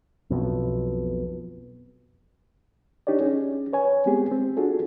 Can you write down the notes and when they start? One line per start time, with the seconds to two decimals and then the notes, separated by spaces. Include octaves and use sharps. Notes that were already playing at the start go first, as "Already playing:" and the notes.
0.30 B1 F2 B2
3.07 D4 D#4 G4 C#5 D5
3.21 C#4 G#4
3.73 B4 C#5 G#5
4.06 G#3 B3 C4 G4 G#4
4.31 C4
4.57 D4 F4 F#4 G#4 A4